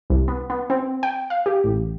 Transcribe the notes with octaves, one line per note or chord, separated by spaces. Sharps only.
C2
B3
B3
C4
G5
F5
G4
A1